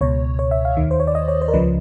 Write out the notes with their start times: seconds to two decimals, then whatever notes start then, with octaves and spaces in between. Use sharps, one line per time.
0.01 C#2 B2 C#5
0.39 C#5
0.51 E5
0.65 F5
0.77 D#2 D#3
0.91 C5
1.00 C#5
1.07 D5
1.15 D#5
1.28 C#5
1.41 C5
1.48 A#4
1.53 C#2 C#3 F3 B4